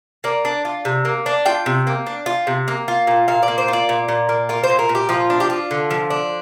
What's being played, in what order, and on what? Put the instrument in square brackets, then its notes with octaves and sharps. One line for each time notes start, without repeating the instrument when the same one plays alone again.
[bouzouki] A#3 D5
D4
F4
C3
A#3
D4
F4 G5
C3
A#3
D4
F4
C3
A#3
F4
A#2
A#2 F5
D5
A#3
C5
F4 D5
A#2
A#2
A#3
F4 A#4
C5
A#2
A#4
A#2
G4
F3 F4
D4
G4
F4
D3
F3
D4